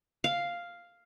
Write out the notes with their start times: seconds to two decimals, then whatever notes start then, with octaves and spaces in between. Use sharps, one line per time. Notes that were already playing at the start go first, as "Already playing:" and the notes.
0.24 F5